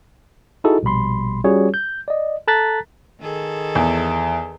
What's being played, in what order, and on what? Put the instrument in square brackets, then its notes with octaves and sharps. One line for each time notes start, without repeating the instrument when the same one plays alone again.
[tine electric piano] D#4 E4 F#4 G#4 A4 D#5
A#1 B2 G3 B5 C6
G3 C#4 F4 F#4 G#4 C#5
G6
D5 D#5
A4 A5 A#5 F#6 A6 B6
[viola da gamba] D#3 G#4 A4
[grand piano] E2